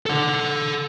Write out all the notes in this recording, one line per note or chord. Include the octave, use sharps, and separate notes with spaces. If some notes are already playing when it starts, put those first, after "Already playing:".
A4 F#5